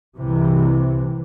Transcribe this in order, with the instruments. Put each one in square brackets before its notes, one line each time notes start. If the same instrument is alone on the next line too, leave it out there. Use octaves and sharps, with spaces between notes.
[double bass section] C2 C3 E3